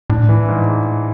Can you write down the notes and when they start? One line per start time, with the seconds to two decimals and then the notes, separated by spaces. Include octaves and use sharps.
0.10 A2 D4
0.29 E3
0.48 G#2